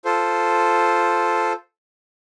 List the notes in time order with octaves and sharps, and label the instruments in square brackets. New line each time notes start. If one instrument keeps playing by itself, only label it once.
[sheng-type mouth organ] F4 A4 C5